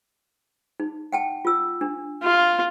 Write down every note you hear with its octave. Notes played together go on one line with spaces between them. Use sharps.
D#4
F#5 G5 A5
F4 E6
D4
F4